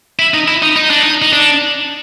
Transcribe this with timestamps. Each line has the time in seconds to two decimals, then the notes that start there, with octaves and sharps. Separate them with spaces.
0.19 E4
0.34 D#4
0.48 E4
0.62 D#4
0.76 D#4
0.90 D4
1.03 D#4
1.22 D#4
1.33 D4